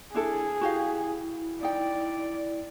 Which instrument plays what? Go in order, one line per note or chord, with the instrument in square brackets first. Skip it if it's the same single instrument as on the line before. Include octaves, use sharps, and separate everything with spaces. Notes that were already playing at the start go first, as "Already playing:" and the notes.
[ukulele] D4 E4 A4 [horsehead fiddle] G#4
[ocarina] E4 [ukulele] F#4 G4 F5
[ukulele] D#4 G5 [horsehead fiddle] D5